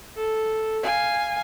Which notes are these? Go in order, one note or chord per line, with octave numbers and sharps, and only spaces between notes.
A4
F5 G#5